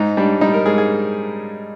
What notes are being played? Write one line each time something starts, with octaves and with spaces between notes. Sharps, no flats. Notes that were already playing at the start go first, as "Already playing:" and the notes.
Already playing: G#2 D#4
G3 D4
G3 D#4
A#4
G#2 G#4
G#4